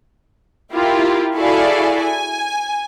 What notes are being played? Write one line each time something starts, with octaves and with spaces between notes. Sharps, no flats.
E4 F4 G4 A#4
E4 F#4 G#4 A4 D5 F5
G#5